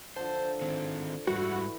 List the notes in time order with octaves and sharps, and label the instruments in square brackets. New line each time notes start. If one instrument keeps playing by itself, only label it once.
[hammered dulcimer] D3 F3 A5 [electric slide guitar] C5
[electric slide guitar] D#3 C4
[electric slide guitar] G#2 G3 [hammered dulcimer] E3 E4 [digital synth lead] F#4